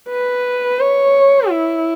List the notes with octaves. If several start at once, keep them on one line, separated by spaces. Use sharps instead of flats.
B4
C#5
E4